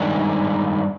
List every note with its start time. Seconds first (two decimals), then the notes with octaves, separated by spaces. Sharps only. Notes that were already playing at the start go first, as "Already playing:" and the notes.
Already playing: G2 D#3 G#3 D4